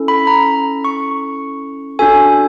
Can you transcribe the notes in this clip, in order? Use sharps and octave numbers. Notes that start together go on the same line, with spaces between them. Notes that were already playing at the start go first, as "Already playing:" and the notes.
Already playing: C#4 E4 A4
B5
A#5
C#6
D4 F#4 A4 G#5